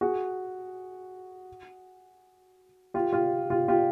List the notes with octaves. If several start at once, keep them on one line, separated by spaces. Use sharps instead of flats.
F#4 G#4
F4 G4
F4 G4
F4 G4
F4 G4